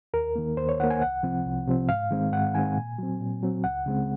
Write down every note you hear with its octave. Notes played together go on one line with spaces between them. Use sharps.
D#2 A#4
D#3 A#3
D#2 C5
C#5
D#3 A#3 F#5
G#5
C2 F#5
C3 F3 C4
C2
C3 F3 C4
G#2 F5
D#3 G#3 C4
G#2 F#5
D#3 G#3 C4 G#5
A#2
F#3 C4
A#2
F#3 C4
C#2 F#5
C#3 G#3 C4